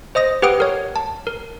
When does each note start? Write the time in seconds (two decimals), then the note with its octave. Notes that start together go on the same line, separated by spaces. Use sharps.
0.15 C5 D#5 D#6 A#6
0.42 G4 B4 F#5 G5 D#6
0.60 A#4 C#5
0.96 A5
1.27 A#4